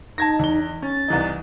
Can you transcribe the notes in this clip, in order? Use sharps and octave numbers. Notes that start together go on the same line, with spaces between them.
D#4 A5 G#6 A#6
E2 G7
C#4 A6
C2 E3 D#4